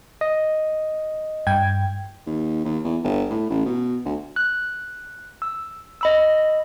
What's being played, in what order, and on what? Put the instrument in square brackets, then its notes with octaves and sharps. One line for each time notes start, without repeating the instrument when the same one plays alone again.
[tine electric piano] D#5
[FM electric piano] G2 G5 G#6
[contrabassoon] D#2
D#2
E2
G1
A2
A1
B2
D2
[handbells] F#6
E6
D#5 B5 E6